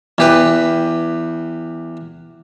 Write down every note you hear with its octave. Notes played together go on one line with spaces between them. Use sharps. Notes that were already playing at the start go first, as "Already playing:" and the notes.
E2 G4 B4